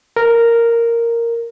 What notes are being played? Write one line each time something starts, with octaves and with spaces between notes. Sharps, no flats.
A#4